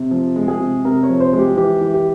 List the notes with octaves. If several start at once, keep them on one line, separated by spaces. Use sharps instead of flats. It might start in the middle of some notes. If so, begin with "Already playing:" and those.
Already playing: C3
F3
G#3
G#4
C3
C3 A#4
C#5
F3
C5
G#3
G4
E3 G4
E3
G4